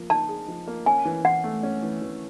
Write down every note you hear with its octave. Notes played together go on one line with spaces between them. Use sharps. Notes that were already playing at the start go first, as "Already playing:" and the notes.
Already playing: F3 A#3
D#4 A5
G#4
F3
A#3
C#4 G#5
E3
E3 F#5
A3
C#4
E3
E3